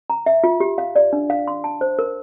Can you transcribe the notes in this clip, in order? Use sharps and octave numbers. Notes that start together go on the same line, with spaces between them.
A#5
E5
F4
G4
F5
D5
D4
F5
C6
A5
C5
A#4